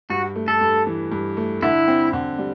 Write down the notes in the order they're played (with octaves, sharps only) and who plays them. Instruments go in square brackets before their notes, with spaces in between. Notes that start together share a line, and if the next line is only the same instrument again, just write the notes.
[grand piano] G2 [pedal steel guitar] F#4
[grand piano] A3
[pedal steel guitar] A4
[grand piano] G2
E3
G2
A3
[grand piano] D3 [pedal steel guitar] E4
[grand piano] C4
D3
G3